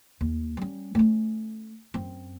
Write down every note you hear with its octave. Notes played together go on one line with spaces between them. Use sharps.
D#2
G3 C#4
A3 C#4
F#2 C4